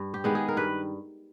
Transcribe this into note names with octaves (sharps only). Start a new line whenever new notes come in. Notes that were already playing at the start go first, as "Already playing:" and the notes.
Already playing: G2
G4
D#3 G#3 B3
G#4
A#4
G2 B4